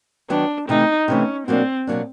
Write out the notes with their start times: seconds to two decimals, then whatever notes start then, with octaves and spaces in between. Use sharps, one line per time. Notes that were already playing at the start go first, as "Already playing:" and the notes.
0.30 D#3 F#3 B3 D4
0.69 C3 E3 A3 D#4
1.08 C3 E3 A3 C#4
1.47 B2 F#3 A#3 C4 D4
1.87 B2 F#3 A#3 D4